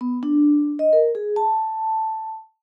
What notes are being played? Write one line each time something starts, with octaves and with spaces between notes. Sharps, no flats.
B3
D4
D#5
A#4
G#4
A5